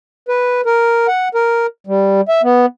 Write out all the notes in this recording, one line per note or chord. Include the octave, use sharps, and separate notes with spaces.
B4
A#4
F#5
A#4
G3
E5
B3